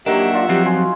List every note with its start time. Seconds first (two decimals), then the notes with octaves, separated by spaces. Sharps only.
0.06 D#3 F#3 A#3 D4 G4 E5 F#5
0.33 F4 D5
0.49 F3 F#3 C4 G4
0.66 F#4 G#5 C6